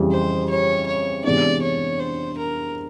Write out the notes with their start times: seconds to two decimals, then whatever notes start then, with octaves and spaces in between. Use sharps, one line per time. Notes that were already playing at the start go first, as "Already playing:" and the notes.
Already playing: F2 C#3 E3 G3
0.12 C5
0.50 C#5
0.87 C#5
1.24 C3 E3 G#3 B3 D4 D5
1.62 C#5
1.99 C5
2.38 A#4